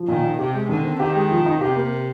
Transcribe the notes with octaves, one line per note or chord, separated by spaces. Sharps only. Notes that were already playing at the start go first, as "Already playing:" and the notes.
Already playing: F3
A#2 D#3
D#4
C3 G4
G#3
D3 D#3
C4
D#3 G4
G#3
F3
D#4
C3 G4
A#3